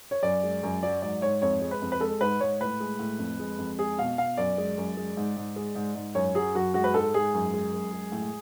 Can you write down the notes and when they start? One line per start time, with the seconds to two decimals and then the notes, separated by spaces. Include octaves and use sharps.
0.11 C#5
0.23 F#2 D5
0.43 G#3
0.63 F#2
0.83 F#3 D5
1.02 G#2 D5
1.22 G#2 C#5
1.42 F2 C#5
1.62 G#3
1.71 B4
1.82 F2
1.92 B4
2.00 G#3 A4
2.21 G#2 B4
2.40 G#2 C#5
2.60 A2 B4
2.80 G#3
2.99 A2
3.19 F2
3.39 G#3
3.58 F2
3.79 G#3 G#4
3.98 B2 F5
4.17 B2 F5
4.37 F#2 D5
4.58 G#3
4.78 F#2
4.97 G#3
5.17 G#2
5.37 G#2
5.56 G#3
5.75 G#2
5.95 G#2
6.15 F#2 C#5
6.35 F#3 G#4
6.55 F#2 F#4
6.74 G#3 F#4
6.84 B4
6.94 G#2 A4
7.14 G#2 G#4
7.34 F#2
7.54 G#3
7.73 F#2
7.93 G#3
8.12 A2